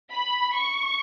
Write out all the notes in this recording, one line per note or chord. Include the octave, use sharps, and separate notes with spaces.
B5
C#6